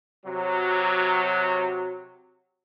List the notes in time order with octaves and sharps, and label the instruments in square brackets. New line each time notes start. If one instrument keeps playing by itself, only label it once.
[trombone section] C3 F#3